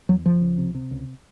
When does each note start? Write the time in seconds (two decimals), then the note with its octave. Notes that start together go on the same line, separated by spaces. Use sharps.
0.09 E2 F#3
0.25 F#1 F3
0.41 C#2
0.58 C3
0.75 C3
0.91 C#2